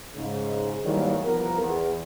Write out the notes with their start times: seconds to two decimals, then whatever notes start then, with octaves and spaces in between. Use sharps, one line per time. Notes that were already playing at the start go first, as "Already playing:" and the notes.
0.15 G#2 C#3
0.84 G#2 D#3 E3 F#3 G3 A#3
1.24 C2 F3 B3 A#4
1.61 E2